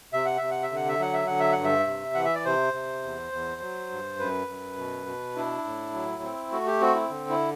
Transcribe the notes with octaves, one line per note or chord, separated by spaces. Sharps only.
C3 E5
F#5
C3 E5
F#5
E5
D3 F#5
E5
F#3 F#5
E5
D3 F#5
E5
F#5
G2
E5
C3
E3 F#5
E5
D5
C3 C5
C3
E2
E2
F#3
G2
F#2 B4
F#2
B2
B2
D4 E4
A2
F#3
C4
A3 F#4
G4
C4 F#4
E4
D3
E4